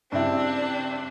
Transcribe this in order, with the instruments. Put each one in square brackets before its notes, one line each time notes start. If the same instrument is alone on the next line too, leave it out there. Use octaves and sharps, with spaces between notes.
[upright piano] G2 C#3 E4 [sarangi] C4 [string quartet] D4